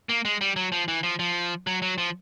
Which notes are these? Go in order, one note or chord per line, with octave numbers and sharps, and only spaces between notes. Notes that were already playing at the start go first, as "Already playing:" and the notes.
A#3
G#3
G3
F#3
F3
E3
F3
F3
F#3
F#3
F3